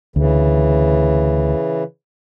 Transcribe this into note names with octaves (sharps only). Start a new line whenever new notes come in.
D2 C#3 E3